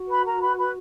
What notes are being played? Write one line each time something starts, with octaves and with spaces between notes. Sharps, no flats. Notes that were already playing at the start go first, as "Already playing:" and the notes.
Already playing: F#4
B4 B5
A#4 A#5
B4 B5
B4 B5